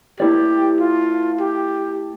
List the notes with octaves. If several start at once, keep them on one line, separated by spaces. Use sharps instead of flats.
A3 E4 G4 B4 D5
F4
G4